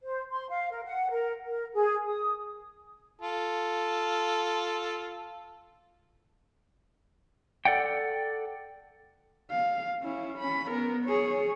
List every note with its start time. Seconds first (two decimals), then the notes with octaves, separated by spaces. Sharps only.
0.01 C5
0.31 C6
0.50 F5
0.70 A#4
0.85 F#5
1.11 A#4
1.45 A#4
1.73 G#4
2.04 D#6
3.22 F4 A4
7.65 A4 D5 F#5 G5
9.50 F5
10.03 C#4 E4
10.38 C#4 B5
10.69 B3 A#4
11.05 G#4 C#5